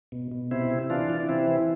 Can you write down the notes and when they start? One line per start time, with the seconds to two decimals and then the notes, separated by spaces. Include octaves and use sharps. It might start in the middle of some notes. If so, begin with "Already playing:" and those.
0.12 B2
0.31 B2
0.51 C3 C4 E4
0.70 C3
0.90 E3 D4 F4
1.10 E3
1.20 D4
1.29 C3 C4 E4
1.48 E3